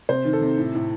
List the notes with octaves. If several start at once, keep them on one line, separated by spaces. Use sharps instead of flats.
C3 C5
D#3
A4
C3
A2
A2